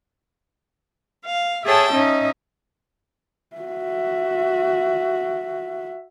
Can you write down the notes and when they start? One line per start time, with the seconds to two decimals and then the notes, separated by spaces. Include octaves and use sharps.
1.25 F5
1.63 G#4 A4 C#5 E5 G5 A5
1.92 C#4 D#4 D#5 E5
3.57 F#4 E5